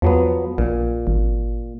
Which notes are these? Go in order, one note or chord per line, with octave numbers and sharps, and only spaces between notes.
E2 F3 F#3 B3
A#1 A#2
G#1